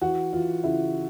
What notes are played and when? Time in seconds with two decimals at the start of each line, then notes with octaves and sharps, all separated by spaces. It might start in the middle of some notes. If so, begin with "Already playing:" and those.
0.02 E3 F#4
0.33 E3 F4
0.64 C#3 E4